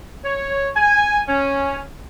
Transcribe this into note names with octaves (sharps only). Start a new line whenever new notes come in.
C#5
G#5
C#4